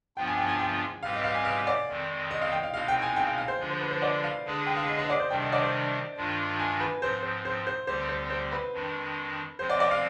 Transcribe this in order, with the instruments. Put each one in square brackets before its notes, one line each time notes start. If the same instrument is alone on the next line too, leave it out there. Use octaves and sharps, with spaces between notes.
[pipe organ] G2 F3 B3 D4 F4 [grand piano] G5
[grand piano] G#5
G5
G#5
G5
[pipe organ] G#2 G3 C4 G4 B4 [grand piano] F5
[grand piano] D#5
F5
G#5
F5
D5
[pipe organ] F2 D#3 G#3 C4
[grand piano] D#5
F5
G5
F5
[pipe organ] B2 G#3 C4 D#4 [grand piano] F5
[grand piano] G5
G#5
G5
F5
F5
C5
[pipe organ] D3 F3 G#3 D4 F4
[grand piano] C5
B4
C5
D5
F5
[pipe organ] D3 G#3 D4 G#4 B4
[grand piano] G5
F5
D#5
D#5
D5
C5
[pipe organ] C3 D#3 G3 D4 [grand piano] G5
[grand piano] D#5
D5
C5
[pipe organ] G2 D#3 G#3 D4 F4
[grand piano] G#5
B4
[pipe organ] G#2 F3 C4 [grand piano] C5
[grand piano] C5
C5
C5
[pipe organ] D2 D3 G3 C4 G4 [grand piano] C5
[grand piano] C5
C5
B4
[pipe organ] F2 D#3 G#3 D4
[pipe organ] F3 G#3 C4 [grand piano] C5
[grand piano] D5
D5
F5